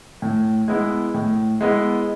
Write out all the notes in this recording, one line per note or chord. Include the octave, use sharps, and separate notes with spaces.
A2
G#3 B3 E4
A2
G#3 B3 E4